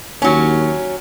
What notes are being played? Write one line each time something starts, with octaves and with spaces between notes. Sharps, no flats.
D#2 F#3 C#4